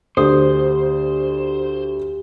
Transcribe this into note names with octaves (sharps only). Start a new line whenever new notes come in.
D2 G4 C5 D#6